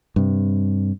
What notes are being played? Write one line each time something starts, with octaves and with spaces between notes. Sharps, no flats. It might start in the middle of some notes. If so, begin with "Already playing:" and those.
G2 C3